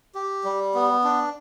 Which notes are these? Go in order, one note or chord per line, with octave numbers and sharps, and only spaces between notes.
G4
G3
B3
D4